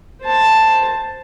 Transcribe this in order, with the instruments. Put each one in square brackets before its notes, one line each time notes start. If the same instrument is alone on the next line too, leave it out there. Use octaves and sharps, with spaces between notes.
[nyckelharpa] C5 A5